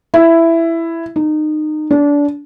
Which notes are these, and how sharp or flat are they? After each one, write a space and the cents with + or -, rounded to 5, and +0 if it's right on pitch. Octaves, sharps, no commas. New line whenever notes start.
E4 +10
D#4 -25
D4 -25